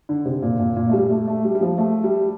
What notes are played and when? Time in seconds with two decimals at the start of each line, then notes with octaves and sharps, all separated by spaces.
0.09 D3
0.25 C3
0.42 A#2
0.59 A#2
0.76 A#2
0.89 A3
0.93 G3
1.10 A3
1.27 A3
1.45 G3
1.55 G3
1.61 F3
1.78 A3
2.04 G3